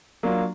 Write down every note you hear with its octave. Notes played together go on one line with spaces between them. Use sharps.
F#3 A#3 D4 F4